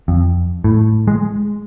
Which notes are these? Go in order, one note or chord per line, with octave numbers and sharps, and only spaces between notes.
F2
A2
G#3